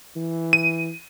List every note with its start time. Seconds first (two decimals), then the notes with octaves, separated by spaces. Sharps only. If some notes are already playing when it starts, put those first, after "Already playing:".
0.16 E3
0.53 D#7